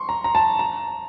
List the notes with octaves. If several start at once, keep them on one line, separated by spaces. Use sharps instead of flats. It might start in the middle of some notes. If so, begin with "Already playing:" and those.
Already playing: C6 C#6
A#5
A#5
A5
A#5